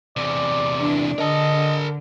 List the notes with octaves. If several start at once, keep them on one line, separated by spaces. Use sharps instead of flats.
E2 C3 D5
E3 D4
D3 A#4 D#5 A5